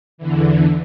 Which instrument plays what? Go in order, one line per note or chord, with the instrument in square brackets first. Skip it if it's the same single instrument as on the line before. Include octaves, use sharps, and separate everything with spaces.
[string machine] E2 D3 E3